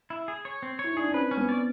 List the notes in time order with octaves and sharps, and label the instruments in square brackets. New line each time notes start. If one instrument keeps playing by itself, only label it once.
[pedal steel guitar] E4
G#4
C#5
C4
[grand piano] E4 [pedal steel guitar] C#5
[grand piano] D#4
[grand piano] D4 [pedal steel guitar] G#4
[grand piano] C#4
[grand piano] C4 [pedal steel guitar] B4
[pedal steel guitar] C#4
[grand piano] B3
[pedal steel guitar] D5